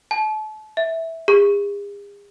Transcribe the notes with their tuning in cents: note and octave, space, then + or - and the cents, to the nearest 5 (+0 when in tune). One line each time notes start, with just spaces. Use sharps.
A5 -35
E5 -10
G#4 -45